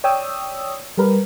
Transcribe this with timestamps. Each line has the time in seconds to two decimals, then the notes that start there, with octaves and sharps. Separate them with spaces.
0.04 C#5 D5 G5 D#6 E6
0.98 G3 G4 A#4 B4